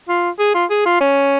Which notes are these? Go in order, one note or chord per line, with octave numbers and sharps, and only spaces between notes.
F4
G#4
F4
G#4
F4
C#4